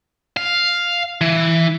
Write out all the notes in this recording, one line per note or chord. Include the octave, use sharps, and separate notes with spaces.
F5
E3